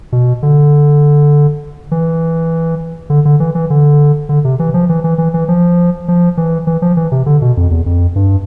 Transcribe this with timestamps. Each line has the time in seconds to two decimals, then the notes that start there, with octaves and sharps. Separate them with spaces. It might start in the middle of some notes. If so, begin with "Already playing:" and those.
0.12 B2
0.43 D3
1.91 E3
3.10 D3
3.25 D3
3.40 E3
3.55 E3
3.70 D3
4.29 D3
4.45 C3
4.59 E3
4.74 F3
4.89 E3
5.04 E3
5.18 E3
5.34 E3
5.48 F3
6.08 F3
6.37 E3
6.67 E3
6.82 F3
6.97 E3
7.12 C3
7.26 D3
7.42 B2
7.57 F2
7.71 E2
7.86 F2
8.16 G2